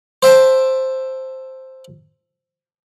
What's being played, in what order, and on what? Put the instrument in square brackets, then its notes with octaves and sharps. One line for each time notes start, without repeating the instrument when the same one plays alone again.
[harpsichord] C5 E5 G5 A5